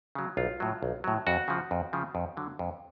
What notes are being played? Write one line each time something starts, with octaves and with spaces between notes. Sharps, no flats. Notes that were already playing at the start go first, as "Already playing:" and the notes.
C#3 F#3
B1 F4
A2 F#3
B1
A2 F#3
F2 F#4
C#3 F3
F2
C#3 F3
F2
D3 F#3
F2